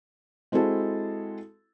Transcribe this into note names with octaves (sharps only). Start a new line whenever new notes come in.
G#3 C4 E4 F#4 G#4 A4